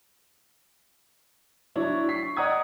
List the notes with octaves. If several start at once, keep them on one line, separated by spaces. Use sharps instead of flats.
F#3 D4 E4 C#5
C#6 B6 C7
D5 D#5 F#5 A#5 D#6 G#6